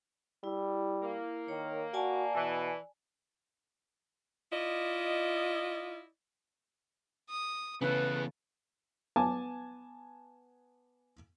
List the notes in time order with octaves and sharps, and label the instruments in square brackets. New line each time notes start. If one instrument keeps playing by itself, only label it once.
[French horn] G3 [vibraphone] E4
[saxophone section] A#3
[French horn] D#3 [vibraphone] C#5
[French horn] F#4 [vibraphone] D5 G#5 A5
[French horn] B2 [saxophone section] E3
[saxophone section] E4 D5 D#5 [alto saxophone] F4
[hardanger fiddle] D#6
[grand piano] C#3 [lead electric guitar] E3 B3 [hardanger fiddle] A3 [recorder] B4
[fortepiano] B3 G#5 A5 D6